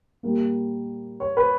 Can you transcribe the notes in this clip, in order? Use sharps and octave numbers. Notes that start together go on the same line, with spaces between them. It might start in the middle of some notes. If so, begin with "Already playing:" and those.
A#2 G3 A#3
C#5
B4